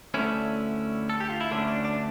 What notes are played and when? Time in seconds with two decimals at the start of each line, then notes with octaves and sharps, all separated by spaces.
0.14 D2 D3 A3 C#4 E4
1.10 A4
1.20 G4
1.30 F4
1.41 E4
1.51 D2 D3 A3 C#4 D4
1.68 D4
1.85 D4